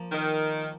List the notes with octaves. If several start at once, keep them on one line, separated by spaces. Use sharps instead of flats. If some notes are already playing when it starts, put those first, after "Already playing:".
Already playing: F3 A#3
D#3